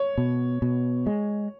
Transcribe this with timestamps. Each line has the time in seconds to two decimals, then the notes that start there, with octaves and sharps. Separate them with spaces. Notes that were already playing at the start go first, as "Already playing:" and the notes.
Already playing: C#5
0.18 B2
0.62 B2
1.06 G#3